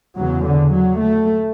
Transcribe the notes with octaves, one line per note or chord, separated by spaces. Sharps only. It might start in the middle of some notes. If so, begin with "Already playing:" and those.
E2 C#3 F#3
D3
F#3
A3